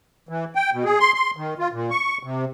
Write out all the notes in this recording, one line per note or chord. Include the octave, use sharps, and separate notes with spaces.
E3
G5
B2
G#4
C6
C6
D#3
F4
A#2
C#6
C3